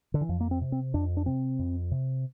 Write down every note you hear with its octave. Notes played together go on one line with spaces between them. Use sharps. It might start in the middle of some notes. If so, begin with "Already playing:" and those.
D3
E3
F2 F3
A#3
C4
C3
C4
F2 D4
D4
C3 C4
F2
C3